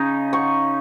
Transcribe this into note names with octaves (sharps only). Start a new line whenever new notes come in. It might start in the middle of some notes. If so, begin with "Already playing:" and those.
Already playing: C#3 D#4
C#6